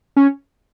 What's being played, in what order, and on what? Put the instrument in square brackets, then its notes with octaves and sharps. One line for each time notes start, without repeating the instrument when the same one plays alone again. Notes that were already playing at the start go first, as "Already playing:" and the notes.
[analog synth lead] C#4